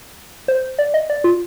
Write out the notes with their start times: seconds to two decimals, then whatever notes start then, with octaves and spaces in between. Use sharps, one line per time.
0.48 C5
0.79 D5
0.94 D#5
1.10 D5
1.24 F4